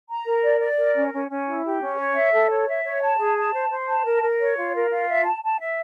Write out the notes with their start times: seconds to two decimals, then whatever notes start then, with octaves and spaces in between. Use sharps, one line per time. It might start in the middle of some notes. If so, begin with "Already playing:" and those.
0.09 A#5
0.25 A#4
0.43 D5
0.61 D5
0.78 A#4
0.95 C#4
1.13 C#4
1.29 C#4
1.47 E4
1.64 G4
1.81 C#4
1.98 C#5
2.15 E5
2.32 A4
2.49 C#5
2.68 E5
2.84 C#5
3.01 A5
3.18 G#4
3.36 A5
3.52 C5
3.70 C5
3.87 A5
4.04 A#4
4.22 A#4
4.40 C#5
4.56 F4
4.74 A#4
4.90 F4
5.08 E5
5.25 A5
5.43 A5
5.60 E5